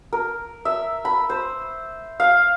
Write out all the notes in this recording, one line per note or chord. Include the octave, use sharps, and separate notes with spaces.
A#4
E5
B5
C5
F5